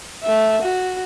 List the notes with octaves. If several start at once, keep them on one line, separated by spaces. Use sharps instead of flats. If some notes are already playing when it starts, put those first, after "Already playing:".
A3 E5
F#4